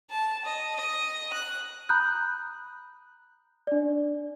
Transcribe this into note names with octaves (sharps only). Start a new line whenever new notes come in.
A5
D#5
D#5
F#6
A#5 B5 D#6 F#6 G6
D4 D5